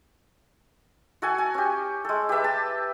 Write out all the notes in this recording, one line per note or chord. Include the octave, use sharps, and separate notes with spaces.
F#4 A4 G#5
G#5
C#4 G4
G#3 A4
G4 B4 E5 D6
A5